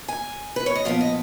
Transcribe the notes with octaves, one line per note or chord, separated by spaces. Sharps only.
G#5
B4
C#5
D#5
A#2 F3 B3 F5
D#5